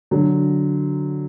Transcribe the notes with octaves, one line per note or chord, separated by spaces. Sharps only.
D3 F#3